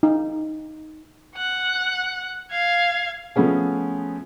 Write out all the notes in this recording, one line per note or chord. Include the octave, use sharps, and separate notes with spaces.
D#4
F#5 F#6
F5 G#6
F3 A3 B3 C#4 G#4